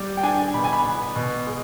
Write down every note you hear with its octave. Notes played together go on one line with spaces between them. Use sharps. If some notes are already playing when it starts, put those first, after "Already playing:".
Already playing: G3
G5
D4 G#5
B2 B5
G#5
B5
B3
B2
G#3